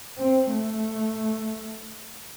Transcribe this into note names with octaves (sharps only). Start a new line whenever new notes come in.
C4
A3